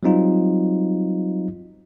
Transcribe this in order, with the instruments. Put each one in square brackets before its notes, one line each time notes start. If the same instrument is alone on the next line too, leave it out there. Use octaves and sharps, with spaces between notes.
[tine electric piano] F#3 G3 C4 D#4 F4